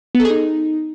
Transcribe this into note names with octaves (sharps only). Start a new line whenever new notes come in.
B3
A4
G#4
D#4